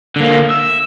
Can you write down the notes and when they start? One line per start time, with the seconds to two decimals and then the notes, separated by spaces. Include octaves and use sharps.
0.16 D3 A#3
0.50 E5